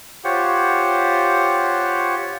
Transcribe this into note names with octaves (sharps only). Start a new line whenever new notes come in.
F4 G4 C5 C#5 F#5